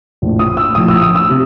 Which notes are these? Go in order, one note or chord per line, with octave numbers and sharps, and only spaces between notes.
A#1 A2 F3
D#6
E6
A#1 A2 F3 D#6
E6
D#6
E6
C3